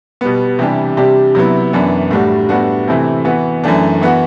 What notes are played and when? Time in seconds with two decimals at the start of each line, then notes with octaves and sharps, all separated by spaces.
0.21 B2 G3 B3
0.59 C3 E3 G3 D4 G4
0.97 C3 G3 D4 G4
1.35 C3 F#3 B3 E4
1.73 F#2 E3 B3 D4
2.11 A2 G3 D4 F#4
2.49 A2 G3 B3 D4 F#4
2.87 C3 E3 A3 C4 E4
3.25 E3 B3 F#4
3.64 F#2 E3 A3 D4
4.01 E3 B3 F#4